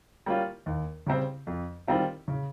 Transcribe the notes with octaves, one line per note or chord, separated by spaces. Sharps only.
G3 A#3 C#4 F4
D#2
C#3 G3 C4
F2
D#3 G3 C4 F4
C#3